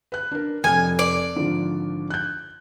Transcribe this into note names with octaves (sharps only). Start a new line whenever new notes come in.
B4 F#6
D4 A#4
F1 F2 G#5 F6
D5
G#1 D3 F3
F#6 G6